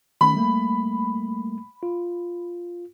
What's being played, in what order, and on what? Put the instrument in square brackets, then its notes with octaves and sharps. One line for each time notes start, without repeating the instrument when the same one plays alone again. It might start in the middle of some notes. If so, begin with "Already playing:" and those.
[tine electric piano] D#3 A3 C#4 [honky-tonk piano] B5
[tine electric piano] G3 A3 A#3
F4